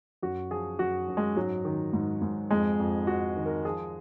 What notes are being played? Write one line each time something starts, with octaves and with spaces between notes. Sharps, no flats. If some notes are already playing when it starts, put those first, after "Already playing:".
F#2 F#4
F3 G#4
F#2 F#4
F#2
G#3
G#2 F#3
D#3
G#2
G#2
F2 G#3
F2
F2 F#4
D#3
A#4
F3 G#4